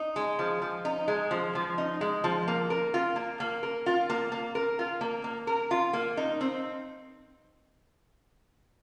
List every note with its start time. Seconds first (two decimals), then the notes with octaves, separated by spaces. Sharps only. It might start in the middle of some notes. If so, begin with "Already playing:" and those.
Already playing: D#4
0.16 G#3
0.39 F3
0.62 F3
0.85 D#4
1.08 G#3
1.31 F3
1.55 F3
1.78 D#4
2.01 G#3
2.24 F3
2.48 A#3
2.70 A#4
2.94 F4
3.16 A#3
3.40 A#3
3.63 A#4
3.86 F4
4.10 A#3
4.32 A#3
4.55 A#4
4.79 F4
5.01 A#3
5.24 A#3
5.47 A#4
5.71 F4
5.93 A#3
6.17 D#4
6.41 C4